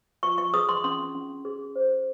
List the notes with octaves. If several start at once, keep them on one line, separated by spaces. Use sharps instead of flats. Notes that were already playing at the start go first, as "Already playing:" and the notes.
F4 C#6
C#6
G#4 D#6
C6
C#4 C6
C#4
G#4
C5